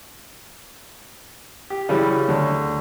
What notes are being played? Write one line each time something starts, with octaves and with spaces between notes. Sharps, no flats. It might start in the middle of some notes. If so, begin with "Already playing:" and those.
G4
C#3 E3 F#3 G3 C#4
D2